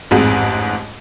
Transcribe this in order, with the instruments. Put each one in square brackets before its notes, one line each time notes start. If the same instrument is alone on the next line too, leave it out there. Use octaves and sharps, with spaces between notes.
[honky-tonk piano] A1 F2 G#2 G#4